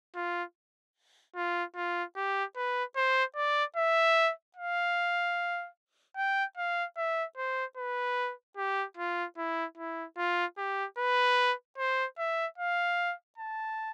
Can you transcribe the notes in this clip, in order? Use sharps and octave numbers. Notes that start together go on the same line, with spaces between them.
F4
F4
F4
G4
B4
C5
D5
E5
F5
G5
F5
E5
C5
B4
G4
F4
E4
E4
F4
G4
B4
C5
E5
F5
A5